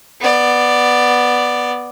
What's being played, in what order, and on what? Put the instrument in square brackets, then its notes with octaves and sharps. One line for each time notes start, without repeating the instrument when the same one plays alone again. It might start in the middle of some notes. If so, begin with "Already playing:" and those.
[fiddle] B3 D5